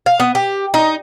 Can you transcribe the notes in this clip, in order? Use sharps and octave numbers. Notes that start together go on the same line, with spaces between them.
F5
B3
G4
D#4